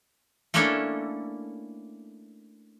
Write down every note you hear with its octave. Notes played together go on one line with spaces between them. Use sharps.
A3 A#3 C#4 D4 E4 A4